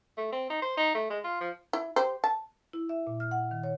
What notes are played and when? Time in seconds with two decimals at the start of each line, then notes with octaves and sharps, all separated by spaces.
0.17 A3
0.32 C4
0.50 D#4
0.62 C5
0.77 D#4
0.95 A3
1.10 G#3
1.24 F4
1.41 F3
1.73 E4
1.96 G4 C5
2.24 A5
2.73 E4
2.89 E5
3.07 A#2
3.20 F6
3.31 F#5
3.51 D#3
3.63 C#5